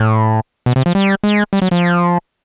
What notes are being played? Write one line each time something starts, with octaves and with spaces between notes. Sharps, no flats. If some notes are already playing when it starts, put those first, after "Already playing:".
Already playing: A2
B2
C3
F3
G3
G#3
G3
F#3
F3